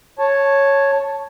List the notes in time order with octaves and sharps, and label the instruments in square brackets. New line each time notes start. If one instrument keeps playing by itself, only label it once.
[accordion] C#5 A5